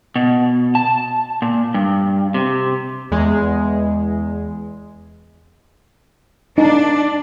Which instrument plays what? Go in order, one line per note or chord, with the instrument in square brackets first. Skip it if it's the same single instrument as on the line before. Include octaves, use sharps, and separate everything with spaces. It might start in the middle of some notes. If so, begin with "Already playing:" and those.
[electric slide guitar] B2
A5
A#2
G2
C3
[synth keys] E2 G#3
[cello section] D4 [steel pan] D#4